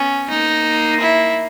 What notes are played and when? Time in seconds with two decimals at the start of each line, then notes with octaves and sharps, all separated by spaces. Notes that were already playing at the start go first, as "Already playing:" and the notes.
Already playing: B3 C#4
0.29 A#3 D#4
1.00 E4